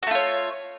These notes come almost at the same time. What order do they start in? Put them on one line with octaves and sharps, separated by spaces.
F#4 A3 F4 C#5